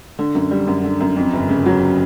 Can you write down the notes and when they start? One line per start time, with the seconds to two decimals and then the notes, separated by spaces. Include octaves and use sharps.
0.19 D3
0.35 F#2
0.51 G3
0.67 F#2
0.84 D3
1.00 F#2
1.16 F2
1.33 G1
1.49 C#3
1.66 F#3